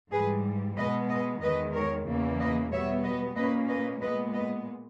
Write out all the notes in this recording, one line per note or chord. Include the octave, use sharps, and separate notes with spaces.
G#2 E3 G3 G#4 B4
B2 G#3 B3 B4 D#5
B4 D#5
E2 D#3 G#3 B4 D#5
A#4 C#5
E2 C#3 E3 A#3
B4 D#5
B2 G3 B3 C#5 E5
B4 D#5
A#2 A#3 C#4 B4 D#5
B4 D#5
A#2 G#3 B3 B4 D#5
B4 D#5